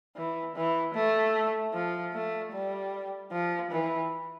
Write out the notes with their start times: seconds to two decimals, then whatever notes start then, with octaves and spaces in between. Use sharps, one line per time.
0.16 E3
0.56 E3
0.95 A3
1.74 F3
2.14 A3
2.53 G3
3.32 F3
3.71 E3